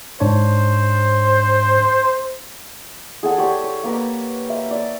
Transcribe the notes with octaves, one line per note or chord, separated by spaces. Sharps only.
G#2 D4 C5 C#5
G#4 A4 F#5 G#5
G4 C#5 D5
C#5
A#3 B4 A#5
E5 F5
D5 A5